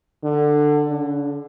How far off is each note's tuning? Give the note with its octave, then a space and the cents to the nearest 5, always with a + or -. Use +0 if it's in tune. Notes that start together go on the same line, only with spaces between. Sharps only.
D3 +15
D3 -45